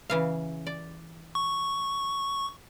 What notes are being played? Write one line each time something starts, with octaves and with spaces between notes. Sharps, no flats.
C#3 E3 F5
D5
C#6